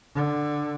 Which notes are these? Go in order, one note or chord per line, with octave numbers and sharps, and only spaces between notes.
D3